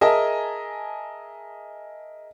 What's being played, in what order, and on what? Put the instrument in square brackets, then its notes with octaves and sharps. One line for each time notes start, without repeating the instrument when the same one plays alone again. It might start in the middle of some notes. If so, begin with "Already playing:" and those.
[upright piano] G#4 A#4 D#5 E5 G#5 A5